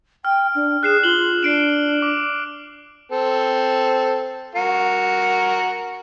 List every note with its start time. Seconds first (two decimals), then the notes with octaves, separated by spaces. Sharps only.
0.25 G5 F6
0.55 D4
0.83 G#4 F#6 C7 E7
1.03 F4 F#7 G7
1.43 D4 C7 D7 E7
2.02 D6
3.11 C4 A4
4.55 F#4 A#4